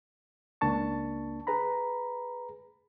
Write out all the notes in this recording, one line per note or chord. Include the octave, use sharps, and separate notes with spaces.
C#2 A#3 D4 A5 C#6
G#4 B4 A#5 B5